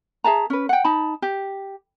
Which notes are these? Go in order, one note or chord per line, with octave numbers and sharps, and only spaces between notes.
G#4 E5 A5 A#5
C#4 B4
F#5 G5
D#4 A5 B5
G4